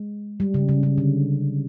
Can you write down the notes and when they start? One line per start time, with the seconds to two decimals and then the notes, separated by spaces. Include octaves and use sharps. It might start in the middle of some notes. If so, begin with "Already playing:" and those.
Already playing: G#3
0.40 G3
0.54 C#3
0.69 C#3
0.83 C#3
0.98 D3